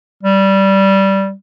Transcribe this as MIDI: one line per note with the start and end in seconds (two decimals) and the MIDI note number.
0.23 1.33 55